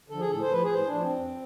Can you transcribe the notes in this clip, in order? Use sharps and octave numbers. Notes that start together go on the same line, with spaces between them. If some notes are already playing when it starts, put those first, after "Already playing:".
D3 F3 A4
G#4
A2 A4
C5
F3 B4
G#4
A2 C5
D4
F3
C4
F2